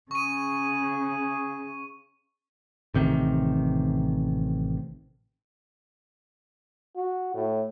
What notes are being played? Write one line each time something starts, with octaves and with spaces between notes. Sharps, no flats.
C#3 G#4 C#6 D#7
A1 C3 D#3
F#4
A2